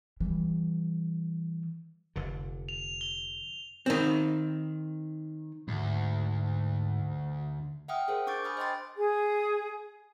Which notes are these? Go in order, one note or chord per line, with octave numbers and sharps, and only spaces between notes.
E3 G3
F1 D3
F7
G7
D#3 C4
D2 G#2
E5 F#5 G5 D#6 F6
G#4 A#4 C5
D4 C#6 D6 G6 A6 D7
G#5 B5 D#6 F6
C5 D#5 G5 B5 C6 A6
G#4